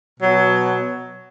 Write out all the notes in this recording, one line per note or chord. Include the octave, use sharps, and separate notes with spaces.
B2 F#3